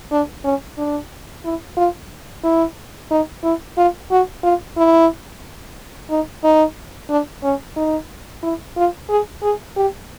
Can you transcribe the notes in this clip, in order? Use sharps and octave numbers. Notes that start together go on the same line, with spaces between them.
D4
C#4
D4
E4
F4
E4
D#4
E4
F4
F#4
F4
E4
D#4
D#4
D4
C#4
D#4
E4
F4
G#4
G#4
G4